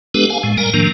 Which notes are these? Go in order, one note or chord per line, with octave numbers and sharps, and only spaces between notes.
G#3 B3 D4 G4 A4 B4
F5 G#5
A2 G#3
G3 A#4 G#5 A#5
A2 D#3 F3 A#3 D4